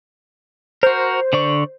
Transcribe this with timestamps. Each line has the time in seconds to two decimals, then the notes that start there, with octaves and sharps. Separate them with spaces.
0.83 F#4 A#4 C5
1.33 D3 D5 C#6